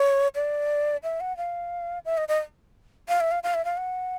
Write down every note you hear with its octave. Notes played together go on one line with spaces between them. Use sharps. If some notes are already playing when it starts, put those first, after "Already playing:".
Already playing: C#5
D5
E5
F#5
F5
E5
D#5
D#5
F5
E5
F5
F5
E5
F5
F#5